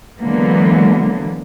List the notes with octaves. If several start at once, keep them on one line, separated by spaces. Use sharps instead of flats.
D3 E3 F#3 G#3 A#3 B3